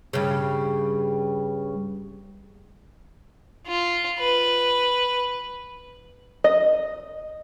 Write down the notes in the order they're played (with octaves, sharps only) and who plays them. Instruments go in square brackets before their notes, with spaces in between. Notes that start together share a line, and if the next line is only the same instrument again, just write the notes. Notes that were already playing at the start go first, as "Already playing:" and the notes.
[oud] G2 C#3
[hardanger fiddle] F4
B4
[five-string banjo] D#5